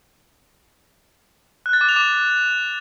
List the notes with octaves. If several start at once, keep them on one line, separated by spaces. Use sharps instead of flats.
F#6
A6
D6
F7
D6